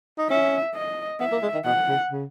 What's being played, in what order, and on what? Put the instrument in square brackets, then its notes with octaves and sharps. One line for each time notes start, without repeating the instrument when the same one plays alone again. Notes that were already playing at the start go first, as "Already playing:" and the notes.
[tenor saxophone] D#4
[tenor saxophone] C#4 [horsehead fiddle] E5
[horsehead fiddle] D#5
[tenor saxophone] B3 [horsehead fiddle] E5
[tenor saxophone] A#3
G#3
D#3
[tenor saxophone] B2 [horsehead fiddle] F#5
[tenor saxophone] C#3
C#3